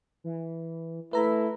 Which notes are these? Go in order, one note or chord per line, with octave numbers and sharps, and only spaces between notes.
E3
A3 E4 B4 E5 A#5